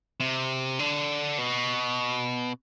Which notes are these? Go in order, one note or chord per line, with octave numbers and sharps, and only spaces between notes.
C3
D3
B2